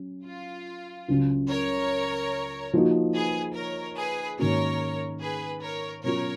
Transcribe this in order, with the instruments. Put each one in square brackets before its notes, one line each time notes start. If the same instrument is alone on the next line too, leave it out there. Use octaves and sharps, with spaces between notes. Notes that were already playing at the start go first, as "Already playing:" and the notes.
Already playing: [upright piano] F#3 C#4
[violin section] F4
[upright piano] C#2 C#3 F#3 C#4
[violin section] A#4 C#5
[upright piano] F3 A#3 D#4 F#4
[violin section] G#4 B4
A#4 C#5
G#4 B4
[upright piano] G#2 D#3 A#3 C#4 F#4 [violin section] A#4 C#5
[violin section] G#4 B4
A#4 C#5
[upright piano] B2 F#3 C#4 F4 [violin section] A#4 C#5